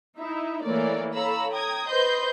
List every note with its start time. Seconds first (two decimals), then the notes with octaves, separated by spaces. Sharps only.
0.18 D#4 E4 E5
0.63 E3 A3 A#3 C#5 D5
1.13 A4 C#5 F5 A#5 B5 E6
1.51 G5 A#5 D#6 G#6
1.88 B4 C5 D#5 C6 G6